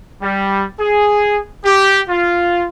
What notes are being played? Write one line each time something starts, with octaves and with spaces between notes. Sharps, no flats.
G3
G#4
G4
F4